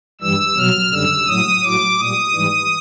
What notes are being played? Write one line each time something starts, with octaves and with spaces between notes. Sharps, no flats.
G2 E3 G3 E6
B2 F#3 F6
F#2 D3 G3 E6
A2 F#3 D#6
A2 F#3 D6
A#2 G3 D#6
G#2 E3 G3